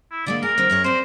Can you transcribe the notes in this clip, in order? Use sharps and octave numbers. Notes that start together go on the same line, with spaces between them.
E4
D3 G#3 A#3 D5
G#4 A#4
D3 F#3 C4
F#2 G#4 C#5
C4 C5 D5